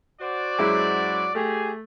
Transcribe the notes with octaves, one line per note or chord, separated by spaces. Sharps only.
F#4 C5 D5
F#2 G#3 E4
A3 G4 G#4